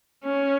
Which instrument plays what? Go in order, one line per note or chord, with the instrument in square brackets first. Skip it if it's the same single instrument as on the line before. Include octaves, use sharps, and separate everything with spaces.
[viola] C#4